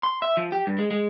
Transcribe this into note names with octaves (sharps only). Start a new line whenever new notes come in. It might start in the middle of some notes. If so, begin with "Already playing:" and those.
C6
E5
F3
G4
G2
G#3
G#3